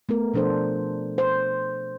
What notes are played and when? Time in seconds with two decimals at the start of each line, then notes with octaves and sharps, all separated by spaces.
0.09 A3 B3 A#4
0.34 B2 F3 D4 A4 C5
1.18 C5